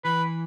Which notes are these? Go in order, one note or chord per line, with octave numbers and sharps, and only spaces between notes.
E3 B4